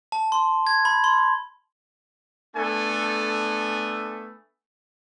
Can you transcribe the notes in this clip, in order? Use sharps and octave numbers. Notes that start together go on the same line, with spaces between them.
A5
C6
G#6
B5
C6
A3 B3 D4 A4 G#5